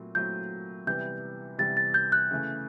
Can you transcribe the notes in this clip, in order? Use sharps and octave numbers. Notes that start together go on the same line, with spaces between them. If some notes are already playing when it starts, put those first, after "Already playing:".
Already playing: A#2 F#3 A3 C4 E4
A#2 F#3 A3 C4 E4 G6
C3 E3 G3 B3 G6
C3 E3 G3 B3 A6
A6
G6
F#6
C#3 E3 A3